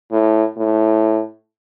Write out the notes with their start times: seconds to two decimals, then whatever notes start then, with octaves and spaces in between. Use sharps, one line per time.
0.12 A2
0.57 A2